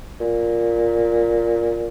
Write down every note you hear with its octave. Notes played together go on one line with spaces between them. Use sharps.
A#2